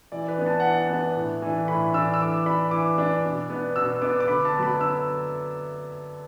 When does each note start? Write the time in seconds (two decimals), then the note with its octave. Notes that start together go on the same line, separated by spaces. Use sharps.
0.12 E3 D5
0.28 B4
0.38 B3 D4
0.46 A5
0.60 E3 F#5
0.74 A5
0.89 B3 D4
1.16 A2
1.42 E3 D4
1.68 A2 B5
1.94 E3 D4 E6
2.14 E6
2.20 E3 D6
2.46 D4 B5
2.71 E3 D6
2.98 D4
3.25 B2
3.50 B3 D4
3.76 B2 E6
4.01 B3 D4 D6
4.20 D6
4.28 D3 B5
4.45 A5
4.53 B3
4.59 F#3 B5
4.80 D3 E6